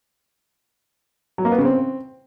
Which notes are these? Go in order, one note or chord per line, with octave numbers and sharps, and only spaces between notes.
F#3
A#3
B3
C#3
C4